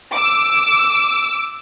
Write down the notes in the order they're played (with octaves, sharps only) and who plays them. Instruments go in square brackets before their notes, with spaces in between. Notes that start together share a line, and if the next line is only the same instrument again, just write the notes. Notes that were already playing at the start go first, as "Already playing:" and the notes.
[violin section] D6 E6